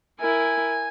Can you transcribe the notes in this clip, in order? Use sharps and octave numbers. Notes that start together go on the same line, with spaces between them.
E4 A#4 G#5